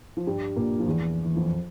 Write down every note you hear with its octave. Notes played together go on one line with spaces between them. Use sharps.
F3
G2 G3
A#2 A#3
F3
E2 E3
E3
F2 F3